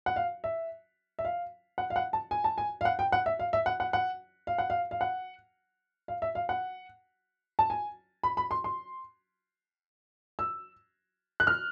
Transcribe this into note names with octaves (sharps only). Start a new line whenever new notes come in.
F#5
F5
E5
E5
F5
F#5
F5
F#5
A5
G#5
A5
G#5
F5
F#5
G5
F#5
E5
F5
E5
F#5
F#5
F#5
F5
F#5
F5
F5
F#5
F5
E5
F5
F#5
A5
G#5
B5
B5
C6
C6
E6
F#6
F6